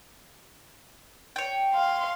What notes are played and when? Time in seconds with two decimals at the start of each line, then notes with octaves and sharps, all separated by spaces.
1.36 C#5 G5
1.74 F5 C6